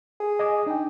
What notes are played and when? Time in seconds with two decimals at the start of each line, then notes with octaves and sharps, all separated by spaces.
0.20 G#4
0.39 D#5 G#5 D6
0.66 D4 D#4 G5